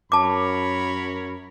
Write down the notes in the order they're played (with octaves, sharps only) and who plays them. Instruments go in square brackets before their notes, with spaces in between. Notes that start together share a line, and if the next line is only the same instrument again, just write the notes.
[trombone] F#2 [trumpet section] A#4 C#5 B5 [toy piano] A5 D6